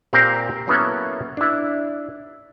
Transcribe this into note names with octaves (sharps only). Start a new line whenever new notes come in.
A#2 C4 G4 A#4 C5 F5
F#3 A#3 B3 C#4 E4 A4
D4 E4